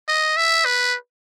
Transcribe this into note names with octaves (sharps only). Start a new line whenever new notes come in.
D#5
E5
B4